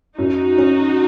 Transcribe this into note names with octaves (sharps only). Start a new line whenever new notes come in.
F#2 D#4 F#4
C#4